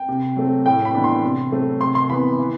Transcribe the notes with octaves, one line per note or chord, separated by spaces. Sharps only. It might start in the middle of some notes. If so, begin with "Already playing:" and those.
Already playing: G5
C3
F#3 A3 C4
A2 G5
B5
E3 B3 D4
C6
C3
F#3 A3 C4
C3 C6
C6
E3 B3 B5
E3